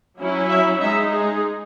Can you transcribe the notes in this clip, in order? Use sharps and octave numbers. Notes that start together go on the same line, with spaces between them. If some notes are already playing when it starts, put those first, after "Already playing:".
F#3 C#4 E4
E5
G#3 D#4 E5
G#4